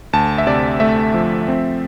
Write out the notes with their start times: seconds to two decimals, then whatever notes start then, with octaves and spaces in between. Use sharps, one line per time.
0.13 D2 A5
0.38 E5
0.47 C3 D5
0.80 A3 E5
1.14 F3
1.48 C4